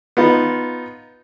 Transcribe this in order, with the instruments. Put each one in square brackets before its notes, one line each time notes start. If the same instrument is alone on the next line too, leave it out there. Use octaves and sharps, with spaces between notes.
[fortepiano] B3 D#4 F4